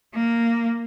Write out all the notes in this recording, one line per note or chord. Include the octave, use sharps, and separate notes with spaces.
A#3